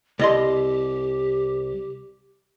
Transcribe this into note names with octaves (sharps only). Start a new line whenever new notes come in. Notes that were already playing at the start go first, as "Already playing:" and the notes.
C2 G4 D#5 C6